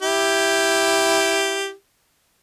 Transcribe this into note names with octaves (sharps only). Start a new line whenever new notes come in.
E4 G4